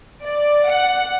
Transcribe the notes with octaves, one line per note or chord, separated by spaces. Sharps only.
D5
F#5